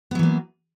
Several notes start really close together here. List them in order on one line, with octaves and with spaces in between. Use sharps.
B3 F#3 E3 A#3